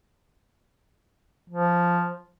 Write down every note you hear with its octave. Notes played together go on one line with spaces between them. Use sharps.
F3